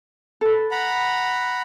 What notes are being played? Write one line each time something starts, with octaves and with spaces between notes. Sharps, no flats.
A4 B4
F#5 A#5 B5